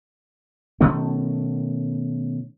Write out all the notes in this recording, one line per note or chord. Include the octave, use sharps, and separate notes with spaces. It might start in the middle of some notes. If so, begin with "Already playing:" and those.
B2 D#3 A3 C#4